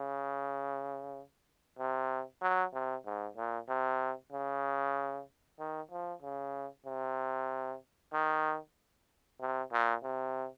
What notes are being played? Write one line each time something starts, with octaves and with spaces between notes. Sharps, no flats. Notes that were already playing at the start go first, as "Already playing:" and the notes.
Already playing: C#3
C3
F#3
C3
G#2
A#2
C3
C#3
D#3
F3
C#3
C3
D#3
C3
A#2
C3